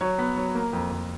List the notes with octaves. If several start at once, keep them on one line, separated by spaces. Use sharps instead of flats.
F#3 C#5
B3
F#3
A#3
F2
F2